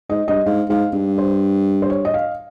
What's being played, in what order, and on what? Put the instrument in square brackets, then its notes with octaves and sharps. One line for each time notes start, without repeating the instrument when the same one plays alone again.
[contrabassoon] G#2 [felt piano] D#5
[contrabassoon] G2 [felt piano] D#5
[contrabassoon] G#2 [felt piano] F5
[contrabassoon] G#2 [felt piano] F5
[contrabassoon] G2
[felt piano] C5
C5
C#5
D#5
F5